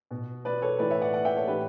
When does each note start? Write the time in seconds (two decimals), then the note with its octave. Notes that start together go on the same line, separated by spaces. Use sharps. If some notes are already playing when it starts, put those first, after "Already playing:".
0.11 B2
0.45 B4 D5
0.62 A4 C#5
0.79 A2 E3 B4 D5
0.90 C#5 E5
1.01 D5 F#5
1.14 D5 F#5
1.25 E5 G5
1.36 A4 C#5
1.47 A2 E3 G4 B4